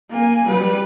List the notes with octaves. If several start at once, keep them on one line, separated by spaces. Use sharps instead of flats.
A#3 G#5
G3 B4